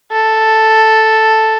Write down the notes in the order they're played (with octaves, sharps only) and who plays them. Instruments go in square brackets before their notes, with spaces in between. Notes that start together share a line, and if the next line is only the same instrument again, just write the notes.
[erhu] A4